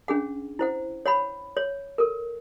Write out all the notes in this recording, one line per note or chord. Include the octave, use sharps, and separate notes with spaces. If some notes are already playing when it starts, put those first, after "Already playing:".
C#4 D4 G#4 F#5
E4 C5 F#5
C#5 F#5 B5
C#5
A4 A#4